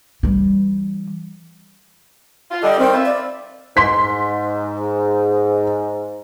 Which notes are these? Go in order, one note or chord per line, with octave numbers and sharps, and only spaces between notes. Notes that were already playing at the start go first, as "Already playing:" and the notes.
E3 G3
F4
D3 G3 D#5
D#3 G3 C4
F4 B4 E5
D5
G#2 C6 B6